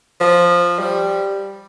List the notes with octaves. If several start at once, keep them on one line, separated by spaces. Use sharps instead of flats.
F3
G3